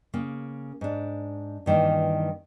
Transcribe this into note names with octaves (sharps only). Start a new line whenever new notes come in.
C#3 A#3
G#2 D4
G2 D#3 E3 A#3